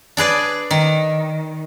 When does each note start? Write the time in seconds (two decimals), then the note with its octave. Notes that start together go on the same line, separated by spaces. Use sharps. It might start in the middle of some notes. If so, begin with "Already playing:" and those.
0.17 D4 G#4 B4 D5
0.71 D#3